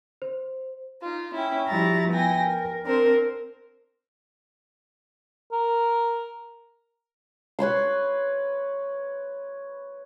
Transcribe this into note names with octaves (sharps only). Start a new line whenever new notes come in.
C5
D#4 F4
C#4 E4 G5
F3 G3 E4 F#4 A#5 A6
B3 E4 G5 G#5 A#6
A#4
C4 D4 A#4 C5
A#4
B4 C#5 B5 C6